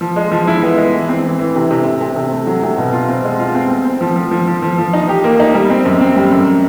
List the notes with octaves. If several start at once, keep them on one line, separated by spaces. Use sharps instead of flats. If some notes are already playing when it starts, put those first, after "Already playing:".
F3
G#3
F3
E4
B3
G#3
E3
C4
E3
E3
C3
C3
C3
C3
C3
A3
F#3
C3
B2
F4
C4
G#3
F4
C4
C4
C4
F3
F3
F3
F3
F3
F3
D#4
G4
A#3
D#4
G3
C4
F#2
C4
G3
F#2